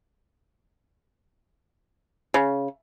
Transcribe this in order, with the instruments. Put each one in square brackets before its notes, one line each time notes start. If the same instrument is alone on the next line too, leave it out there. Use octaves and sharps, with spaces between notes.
[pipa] C#3